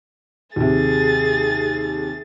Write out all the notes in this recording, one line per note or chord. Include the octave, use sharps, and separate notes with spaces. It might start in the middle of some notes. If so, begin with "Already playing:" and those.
D#2 C3 G#4 A6